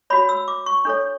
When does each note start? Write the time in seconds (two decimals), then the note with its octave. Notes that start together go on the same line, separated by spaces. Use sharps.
0.10 F#4 C#5 B5
0.29 E6
0.48 D6
0.66 C#6
0.85 D4 A4 C#5